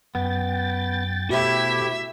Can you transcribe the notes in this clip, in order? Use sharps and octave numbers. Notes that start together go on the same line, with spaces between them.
F#2 B3 G5 A6
B2 A3 E4 F#4 G4 C5 E5 B5